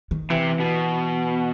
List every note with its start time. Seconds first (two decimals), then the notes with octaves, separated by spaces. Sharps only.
0.11 D#3
0.30 C3 E3
0.60 B2